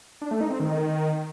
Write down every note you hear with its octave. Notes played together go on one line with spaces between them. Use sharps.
D4
A3
D#4
C4
D#3